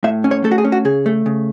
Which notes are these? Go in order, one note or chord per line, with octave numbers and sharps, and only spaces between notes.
A2 E5
C#4
C#5
A3 A4
F#4
G#4
C#4
F#4
C#3 G#4
A3
C#3